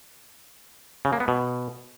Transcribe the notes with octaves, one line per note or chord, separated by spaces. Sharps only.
C#3
A#3
B3
B2